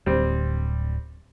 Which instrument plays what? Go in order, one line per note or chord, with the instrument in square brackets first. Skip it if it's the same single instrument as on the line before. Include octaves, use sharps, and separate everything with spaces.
[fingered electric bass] D1 [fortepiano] G3 C4